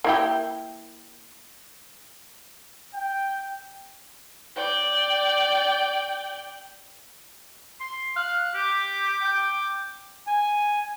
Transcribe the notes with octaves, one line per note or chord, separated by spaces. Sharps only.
A#3 E4 G4
G5
D5 G5
C6
F5 F#6
G4 D6
G5
G#5